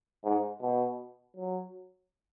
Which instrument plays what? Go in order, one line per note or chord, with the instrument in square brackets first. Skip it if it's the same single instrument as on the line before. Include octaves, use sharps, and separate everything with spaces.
[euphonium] G#2
B2
F#3